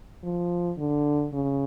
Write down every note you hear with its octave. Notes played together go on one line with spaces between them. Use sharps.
F3
D3
C#3